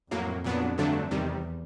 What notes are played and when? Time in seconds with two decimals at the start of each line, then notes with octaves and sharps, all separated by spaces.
0.11 F2 A2 F#3 A#3
0.44 A#2 F#3 B3 D4
0.78 G2 D3 F#3 A3 D4
1.11 E2 C3 D#3 G3